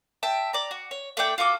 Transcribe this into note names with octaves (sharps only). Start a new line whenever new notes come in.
E5 G5 A5
D5 A#5
F#4
C#5
A3 D4 D5 G5
F4 F#4 A4 D6